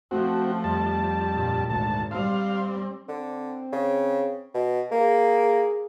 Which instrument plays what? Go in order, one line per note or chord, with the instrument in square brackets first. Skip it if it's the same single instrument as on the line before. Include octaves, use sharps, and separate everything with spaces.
[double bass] F3 A3 [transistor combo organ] C4 F#4
[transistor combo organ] F2 G3 A5
[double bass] G2 A#2
[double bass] G#1 [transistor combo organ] D2 A5
[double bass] G3 C4 [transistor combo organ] F5
[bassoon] D3 [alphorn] C4
[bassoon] C#3
B2
[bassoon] A#3 [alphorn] G#4